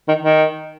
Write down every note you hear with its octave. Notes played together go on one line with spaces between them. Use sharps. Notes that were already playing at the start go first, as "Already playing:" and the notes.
D#3
D#3